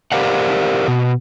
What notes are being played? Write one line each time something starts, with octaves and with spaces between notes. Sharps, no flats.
G4 A#4 C5 D5 F5 F#5
B2